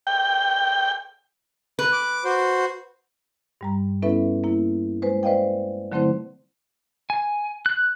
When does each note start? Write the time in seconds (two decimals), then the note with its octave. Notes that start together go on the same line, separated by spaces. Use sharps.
0.07 G5
1.79 B4
1.92 D6
2.25 F#4 C5
3.61 G2 G3 A#5
4.02 B3 C#4 E4 A4 B4 E5
4.44 A#3 E4
5.02 G#3 B4 C5
5.23 B4 C5 D5 D#5 F5 G5
5.92 D3 F#3 A3 C4 E4 C5
7.10 G#5
7.66 F#6